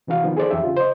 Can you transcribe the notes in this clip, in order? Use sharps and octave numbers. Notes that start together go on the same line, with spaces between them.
C3 E3 D4 F#4 F5
D#3 F3 B3 D#4
G#4 A4 C5 D5
F2 E3 D4 G4 E5
C#3 F4
C5 D#5